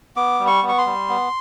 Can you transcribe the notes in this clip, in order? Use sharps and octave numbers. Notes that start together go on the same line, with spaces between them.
B3 D6
G3
C#6
B3
C#6
C6
G3
B3